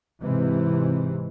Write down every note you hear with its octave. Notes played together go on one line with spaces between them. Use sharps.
G#2 C3 E3